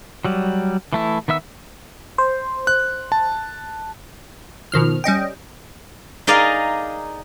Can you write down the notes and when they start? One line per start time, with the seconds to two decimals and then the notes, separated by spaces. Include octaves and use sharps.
0.25 F#3 G3
0.93 E3 A3 E4
1.28 D#3 B3 E5 E6
2.18 C5
2.67 F#6
3.12 A5
4.72 B2 D#3 F3 F6
5.04 G3 C#4 D#5 G5
6.27 D#4 G#4 A#4 D5 D#5 F5